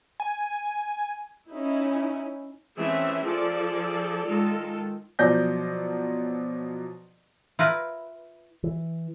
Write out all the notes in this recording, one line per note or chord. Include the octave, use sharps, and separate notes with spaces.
G#5
C#4 D#4 E4
E3 A3 C4 C#4 G#4 E5
F3 G#4 A4 D5
D#3 G#3 F4 A4
B2 F3 F#3 D5 G6 A#6
E4 F4 A#4 B4
E3